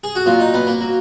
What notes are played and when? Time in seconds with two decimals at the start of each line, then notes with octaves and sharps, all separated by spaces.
0.04 G#4
0.15 F#4
0.26 A#2 F#3 F4
0.40 D#4
0.54 B3
0.67 A#3
0.81 F#3